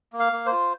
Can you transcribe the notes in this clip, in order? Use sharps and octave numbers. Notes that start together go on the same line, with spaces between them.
A#3
F5
A#3
C5
F4